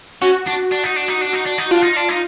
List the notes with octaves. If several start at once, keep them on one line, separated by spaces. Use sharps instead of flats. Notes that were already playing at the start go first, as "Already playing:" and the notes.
C#4 F#4
D4
D4
D#4
D4
D#4
D4
D#4
D4
D#4
D4 F4
D#4
D4
D#4